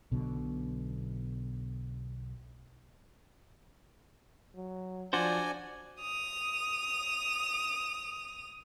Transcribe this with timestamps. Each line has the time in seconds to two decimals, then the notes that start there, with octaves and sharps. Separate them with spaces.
0.12 B1 B2 D3
4.56 F#3
5.13 F3 D4 F#4 C5 D5 G#5
6.00 D#6 F7